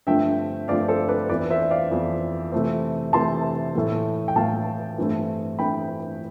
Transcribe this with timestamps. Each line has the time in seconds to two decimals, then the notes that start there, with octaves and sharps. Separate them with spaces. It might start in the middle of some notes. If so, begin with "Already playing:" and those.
0.07 G2 D3 F3 A3 C4 E5 G5
0.68 G2 D3 F3 A3 C4 D5 F5
0.88 A4 C5
1.09 B4 D5
1.29 F2 E3 B3 B4 D5
1.50 C5 E5
1.71 D5 F5
1.91 F2 E3 B3
2.52 C3 E3 A3 C4
3.13 C3 E3 A3 C4 A5 C6
3.74 A2 E3 A3
4.28 G5
4.36 A2 E3 A3 F5 A5
4.98 G2 E3 A3 C4 E4
5.59 G2 E3 A3 C4 E4 G5 B5